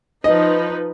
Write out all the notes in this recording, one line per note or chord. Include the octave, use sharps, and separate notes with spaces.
F3 D#4 B4 D#5